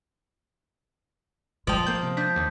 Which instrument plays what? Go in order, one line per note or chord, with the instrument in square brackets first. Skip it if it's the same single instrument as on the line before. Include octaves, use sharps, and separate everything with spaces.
[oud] F3 [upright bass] G#3 [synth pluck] G5 D6 [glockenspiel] A5 D#6
[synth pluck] A#3 G6
C3
[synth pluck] D4 [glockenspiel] A5 G6 B6
[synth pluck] D#2